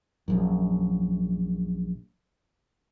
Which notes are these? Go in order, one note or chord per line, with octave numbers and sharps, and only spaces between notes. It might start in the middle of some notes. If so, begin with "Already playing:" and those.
A#1 F#2